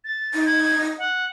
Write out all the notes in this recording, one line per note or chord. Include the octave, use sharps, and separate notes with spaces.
A6
D#4
G#6
F#5